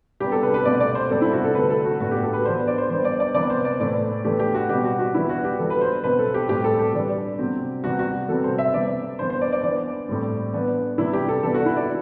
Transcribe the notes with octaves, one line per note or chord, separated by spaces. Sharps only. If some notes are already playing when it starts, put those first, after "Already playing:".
C3 G3 B3 D4 G4
A4
B4
B4
B2 A3 C4 D5
D5
C5
C3 G3 C4 A4
E4
F#4
A4
D3 A3 C4 B4
A4
F#4
A2 F#3 B3 D4 F#4
G4
A4
B4
E3 B3 D4 C5
D5
C5
E3 G3 B3 D4 C5
D5
D5
C3 E3 B3 D5
C5
D5
A2 E3 A3 D5
E3 A3 D4 G4
G4
F#4
B2 G3 C4 G4
F#4
F#4
E3 G3 B3 E4
F#4
G4
E3 G3 D4 A4
B4
C5
B2 F#3 C4 B4
A4
G4
A2 G3 C4 G4
A4
G4
E3 G3 D4
C3 F#3 C4
C3 E3 G3 F#4
F#4
C3 E3 G3 C4 A4
C5
E5
E3 G3 C4 D5
E3 B3 D4 C5
C5
D5
D5
E3 B3 D4 D5
A2 G3 C4
E3 B3 D4
C3 E3 G3 E4
G4
A4
E3 B3 D4 A4
F#4
E4
D5